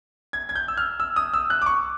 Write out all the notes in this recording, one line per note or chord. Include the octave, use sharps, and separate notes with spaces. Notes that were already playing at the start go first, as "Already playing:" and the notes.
G#6
G#6
G6
E6
F6
E6
D#6
E6
F#6
D6
C#6